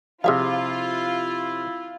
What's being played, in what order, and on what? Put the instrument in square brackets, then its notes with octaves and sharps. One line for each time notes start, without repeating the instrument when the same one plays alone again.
[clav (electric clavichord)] C3 F3 [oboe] E4 [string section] F4 [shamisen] G#4 E5 F5